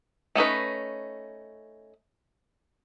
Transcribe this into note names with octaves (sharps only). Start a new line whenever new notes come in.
A3 C#4 D#4 B4